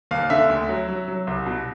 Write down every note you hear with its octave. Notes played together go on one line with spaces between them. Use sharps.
D#2 F5
D3 E5
D2
F#3
F#3
F#3
C2
B2